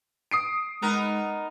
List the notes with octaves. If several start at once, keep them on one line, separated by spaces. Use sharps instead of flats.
D#6 C7 D7
G#3 B3 D#4 A#4